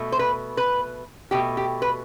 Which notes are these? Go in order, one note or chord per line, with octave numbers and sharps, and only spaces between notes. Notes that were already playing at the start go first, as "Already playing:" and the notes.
Already playing: B2 A3
C5
B4
B4
B2 A3 G4
G4
B4